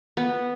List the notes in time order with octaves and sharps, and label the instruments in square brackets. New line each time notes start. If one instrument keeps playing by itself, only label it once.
[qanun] B3